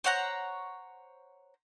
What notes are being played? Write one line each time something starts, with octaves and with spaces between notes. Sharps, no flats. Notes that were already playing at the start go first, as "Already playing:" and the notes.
C5 C#5 F#5 A#5